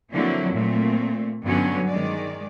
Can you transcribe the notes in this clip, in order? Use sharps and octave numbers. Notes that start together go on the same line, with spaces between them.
D3 F3 F#3 A#3 C4 E4
A#2 A3 C4
G2 D3 F#3 B3 C#4
D#3 G#3 D5